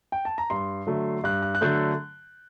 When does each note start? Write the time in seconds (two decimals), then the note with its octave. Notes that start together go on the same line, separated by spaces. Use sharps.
0.12 G5
0.25 A5
0.38 A#5
0.50 G2 C6
0.87 D3 F#3 A3
1.24 G2 F#6
1.42 F#6
1.55 F#6
1.61 D3 F#3 A3 G6